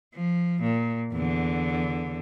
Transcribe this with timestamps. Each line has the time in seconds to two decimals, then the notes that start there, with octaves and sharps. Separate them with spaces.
0.14 F3
0.62 A#2
1.12 E2 D3